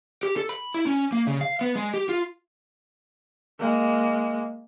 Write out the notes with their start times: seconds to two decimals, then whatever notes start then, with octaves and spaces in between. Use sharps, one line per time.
0.23 G4
0.37 A4
0.49 B5
0.74 E4
0.86 C#4
1.12 A#3
1.27 C#3
1.41 F5
1.61 B3
1.76 G#3
1.94 G4
2.09 F4
3.59 G#3 A#3